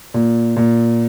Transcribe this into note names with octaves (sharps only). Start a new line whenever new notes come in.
A#2
A#2